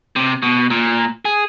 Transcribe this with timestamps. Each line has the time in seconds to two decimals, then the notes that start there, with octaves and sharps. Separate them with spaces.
0.16 C3
0.42 B2
0.70 A#2
1.25 G#4